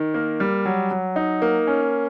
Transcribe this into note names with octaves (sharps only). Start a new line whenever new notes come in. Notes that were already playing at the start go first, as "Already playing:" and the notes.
Already playing: D#3
A#3
G3
F#3
F#3
D#4
A#3
C#4